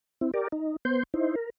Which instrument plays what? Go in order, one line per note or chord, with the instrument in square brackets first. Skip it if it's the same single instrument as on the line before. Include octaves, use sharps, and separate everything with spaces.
[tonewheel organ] C4 E4
G4 A#4 D5
D#4
B3 C5 C6 G6
D#4 E4 C5
A#4